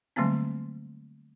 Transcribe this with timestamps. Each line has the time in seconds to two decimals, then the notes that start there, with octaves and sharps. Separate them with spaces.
0.16 D3 F#3 G3 A3 A#3 C4